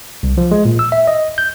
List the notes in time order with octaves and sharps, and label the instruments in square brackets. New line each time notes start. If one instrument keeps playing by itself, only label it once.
[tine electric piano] C2
F3
G#3
A#2
E6
E5
D#5
G6